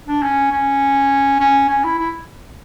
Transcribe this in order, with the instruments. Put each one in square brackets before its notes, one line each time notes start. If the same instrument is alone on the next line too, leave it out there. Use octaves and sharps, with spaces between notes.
[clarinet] D4
C#4
C#4
C#4
C#4
E4
E4